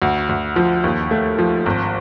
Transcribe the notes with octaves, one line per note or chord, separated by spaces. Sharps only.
D2
D2
F3
D#2
A3
F3
G#1